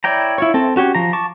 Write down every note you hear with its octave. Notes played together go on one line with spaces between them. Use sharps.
E4 C#5 D5 G5 A#5
E4 F4 C#5
C4 A4
C#4 F#4 G4 C#5
F3 A#5
A5 C#6 D6